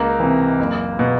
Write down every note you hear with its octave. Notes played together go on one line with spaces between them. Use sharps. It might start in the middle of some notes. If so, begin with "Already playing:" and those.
Already playing: C#2 A#3
C3 E3
F#1
B2